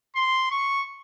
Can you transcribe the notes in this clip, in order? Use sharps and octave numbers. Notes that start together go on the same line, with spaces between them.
C6
C#6